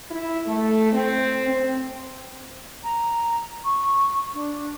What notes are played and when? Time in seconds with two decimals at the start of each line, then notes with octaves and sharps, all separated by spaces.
0.11 E4
0.46 A3
0.92 C4
1.49 C4
2.84 A#5
3.65 C#6
4.34 D4